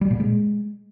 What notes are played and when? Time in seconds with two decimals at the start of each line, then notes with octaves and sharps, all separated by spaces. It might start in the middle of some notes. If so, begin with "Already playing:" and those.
0.01 G3
0.11 A#2
0.20 G#3